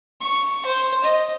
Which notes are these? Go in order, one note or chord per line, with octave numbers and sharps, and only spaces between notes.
C#6
C5
D#5